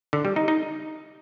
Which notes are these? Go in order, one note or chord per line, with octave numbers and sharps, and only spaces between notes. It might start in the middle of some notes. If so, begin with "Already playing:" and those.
D3
G3
D#4
D#4